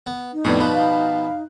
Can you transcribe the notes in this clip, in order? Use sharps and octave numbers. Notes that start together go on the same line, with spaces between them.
B3
D#4
F2 A2 G3 B3 G#4
B2 F3 G3 B5 F#6
F5